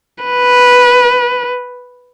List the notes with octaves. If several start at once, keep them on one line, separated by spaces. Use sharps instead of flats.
B4